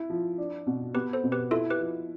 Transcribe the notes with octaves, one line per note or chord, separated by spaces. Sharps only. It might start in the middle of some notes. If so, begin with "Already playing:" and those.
Already playing: E4
F3
D4
B2
B3 G4 B4
A4 C5
B2
G4 B4
E4 F4 A4
G4 B4
F3